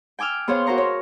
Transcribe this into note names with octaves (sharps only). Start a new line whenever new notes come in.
G5 G#5 D6 E6 F6
B3 G#4 C5 C#5 F5 G5
F#4 A#4 C5 A#5 C#6 F6
C#5